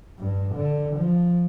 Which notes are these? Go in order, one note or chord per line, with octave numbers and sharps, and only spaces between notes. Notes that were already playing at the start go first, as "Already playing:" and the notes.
G2
D3
F3